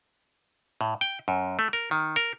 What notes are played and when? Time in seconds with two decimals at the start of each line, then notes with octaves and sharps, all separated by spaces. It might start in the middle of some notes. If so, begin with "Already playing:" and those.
0.81 A2
1.01 G5
1.28 F#2
1.59 A3
1.73 A#4
1.91 D#3
2.16 A#4